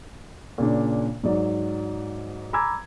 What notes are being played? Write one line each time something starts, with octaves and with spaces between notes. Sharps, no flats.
A#2 C#3 D4
G#2 F#3 D5
G#5 A#5 B5 D6 E6 G#6